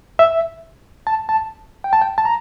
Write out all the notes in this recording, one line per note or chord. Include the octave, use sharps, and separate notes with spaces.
E5
A5
A5
G5
A5
G5
A5
A#5